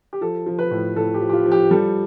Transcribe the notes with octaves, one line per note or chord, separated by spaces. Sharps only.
G4
F3 A4
F3
B4
A2
A2 A4
G4
F3
G4
F4
F3
G4
G3 A4